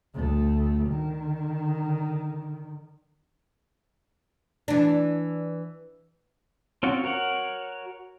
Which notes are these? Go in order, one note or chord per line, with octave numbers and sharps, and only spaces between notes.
D2 A3
D3 D#3
E3 D4
C4 C#4 F4 F#4 C#5
F#4 A#4 C#5 F#5